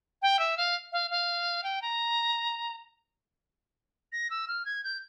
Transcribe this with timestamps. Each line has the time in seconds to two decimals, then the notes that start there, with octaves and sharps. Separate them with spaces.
0.22 G5
0.39 E5
0.57 F5
0.92 F5
1.11 F5
1.63 G5
1.82 A#5
4.12 A#6
4.30 E6
4.48 F6
4.65 G#6
4.84 G6